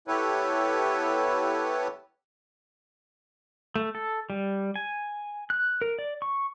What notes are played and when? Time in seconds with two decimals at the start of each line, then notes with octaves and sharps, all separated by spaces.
0.08 B3 E4 G4 A4 B4 C#5
3.76 A3
3.95 A4
4.30 G3
4.76 G#5
5.50 F#6
5.82 A#4
5.99 D5
6.22 C#6